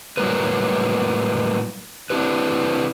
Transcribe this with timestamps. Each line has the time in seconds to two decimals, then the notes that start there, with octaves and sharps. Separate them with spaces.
0.17 A2 F#3 G3 A#3 A#4 B4
2.10 C4 D4 E4 G4 B4